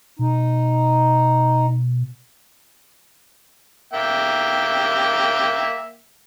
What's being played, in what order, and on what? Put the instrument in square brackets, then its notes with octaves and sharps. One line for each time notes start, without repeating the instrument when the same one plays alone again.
[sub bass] B2 [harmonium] D#4
[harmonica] A#3 E5 G5